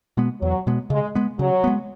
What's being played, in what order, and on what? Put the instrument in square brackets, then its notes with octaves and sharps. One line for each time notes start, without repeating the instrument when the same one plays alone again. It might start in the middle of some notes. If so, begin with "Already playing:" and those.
[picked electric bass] B2 G#3 B3
[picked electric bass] E2 [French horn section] F#3
[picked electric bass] B2 G#3 B3
[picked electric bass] C#3 [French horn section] G#3
[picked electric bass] G#3 B3
[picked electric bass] C#3 [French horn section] F#3
[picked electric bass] G#3 B3